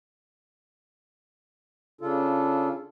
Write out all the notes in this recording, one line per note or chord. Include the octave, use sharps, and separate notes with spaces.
C#3 D4 F4 A4